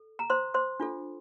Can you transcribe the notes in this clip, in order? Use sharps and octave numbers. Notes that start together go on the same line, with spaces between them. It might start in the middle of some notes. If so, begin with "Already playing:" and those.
Already playing: A4
A#5
C5 C6
C5 C6
D4 F4 A4